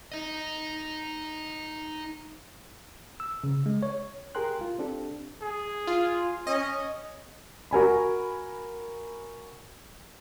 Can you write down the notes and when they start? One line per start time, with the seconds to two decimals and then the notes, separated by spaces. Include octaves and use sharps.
0.12 D#4 D#5
3.20 E6
3.44 C#3
3.66 G#3
3.83 C#5
4.35 G4 G#4 A#4 G5 C6 F#6
4.61 F4
4.79 C4 D4 G4 A4
5.42 G#4
5.87 F4
6.47 C#4 D#5
7.71 F#4 A#4 G#5 B5